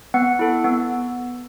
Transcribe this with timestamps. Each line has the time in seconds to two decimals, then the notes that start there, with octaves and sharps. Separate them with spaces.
0.14 B3 F#5
0.39 E4 A4
0.64 B3